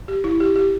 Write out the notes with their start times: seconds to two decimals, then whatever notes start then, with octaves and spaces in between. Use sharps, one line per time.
0.08 G4
0.24 E4
0.40 G4
0.56 G4